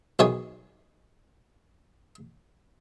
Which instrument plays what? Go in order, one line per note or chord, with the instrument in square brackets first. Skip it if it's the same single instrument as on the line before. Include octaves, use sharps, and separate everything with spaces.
[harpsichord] B1 D#3 G#3 C#5 D#6